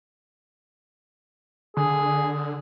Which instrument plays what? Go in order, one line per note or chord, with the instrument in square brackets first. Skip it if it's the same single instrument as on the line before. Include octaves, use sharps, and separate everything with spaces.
[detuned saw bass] D3 [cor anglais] G#4